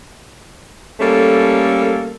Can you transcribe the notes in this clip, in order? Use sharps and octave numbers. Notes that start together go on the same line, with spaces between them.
G3 A3 A#3 C#4 A4